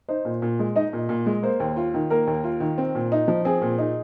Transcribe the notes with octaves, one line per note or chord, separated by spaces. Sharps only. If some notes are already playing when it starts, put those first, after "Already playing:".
D#4 C5
A#2
A#2
G#3
D#4 D#5
A#2
A#2
G#3
A#3 C5
D#2
F4
D#3
A#3 A#4
D#2
F4
D#3
C4
A#2
D#4
F3
C4 G#4
A#2
D#4